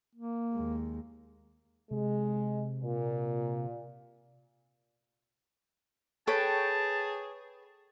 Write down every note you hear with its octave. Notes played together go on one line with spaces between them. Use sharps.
A#3
D#2 G#3
C3 G#3
A#2
G#4 A4 B4 C#5 G5 A5